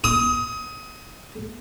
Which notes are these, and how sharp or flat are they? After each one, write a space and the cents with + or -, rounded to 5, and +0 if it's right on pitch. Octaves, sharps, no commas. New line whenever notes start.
D#6 +25